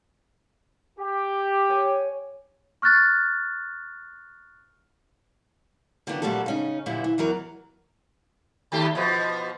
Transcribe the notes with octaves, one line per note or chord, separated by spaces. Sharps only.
G4
C#5 G#5
C#6 F6 F#6 A6
D3 D#3 F3 F#3 B3 D4
A#2 F#3 G3 A3 F#4 A4
C#3 C#4 D#4
F#2 A#2 D3 F3 G3 E4
E3
E2 E3 F#3 A#4
D#2 A3 G4
B2 F3